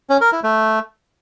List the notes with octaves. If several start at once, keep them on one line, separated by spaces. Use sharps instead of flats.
C#4
A#4
E4
A3